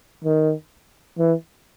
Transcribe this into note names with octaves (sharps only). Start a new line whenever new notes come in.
D#3
E3